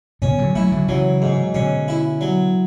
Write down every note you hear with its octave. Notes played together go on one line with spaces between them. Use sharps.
B2 D3 C#4
D3 F#3
F#3 A3 E4
D3 F#3
C#3 E3 F#3
G#2
B2 D3 C#4
E4
F#3